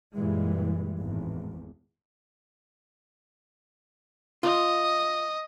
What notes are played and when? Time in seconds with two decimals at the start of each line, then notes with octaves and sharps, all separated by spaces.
0.14 F#2 A#2 E3 G3 G#3
1.01 G#1 E2 A2
4.43 F4 D#5